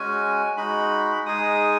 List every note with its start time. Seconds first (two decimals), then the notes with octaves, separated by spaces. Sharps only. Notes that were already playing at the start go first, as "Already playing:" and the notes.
Already playing: G#3 C#4 F#4 G#5
0.57 G#3 D#4 F#4 B5
1.26 G#3 D#4 G#4 D#6